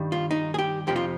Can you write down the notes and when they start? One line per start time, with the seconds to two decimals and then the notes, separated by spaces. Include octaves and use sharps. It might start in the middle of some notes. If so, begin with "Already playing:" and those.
Already playing: G2 D#3 G3
0.12 F4
0.31 D#4
0.54 G#4
0.59 G4
0.87 F2 C3 F3 G4
0.96 F4